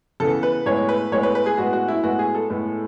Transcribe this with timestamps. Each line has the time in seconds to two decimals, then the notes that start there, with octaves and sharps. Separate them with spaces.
0.20 C#3 E3 B3 A4
0.43 B4
0.66 A2 G#3 B3 C#5
0.89 B4
1.12 A2 G#3 B3 C#5
1.23 B4
1.35 B4
1.46 G#4
1.57 A2 G#3 B3 F#4
1.73 F#4
1.88 E4
2.03 A2 G#3 B3 F#4
2.19 G#4
2.35 A4
2.49 A2 G#3 B3